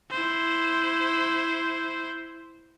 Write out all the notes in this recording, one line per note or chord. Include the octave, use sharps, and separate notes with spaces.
E4 C5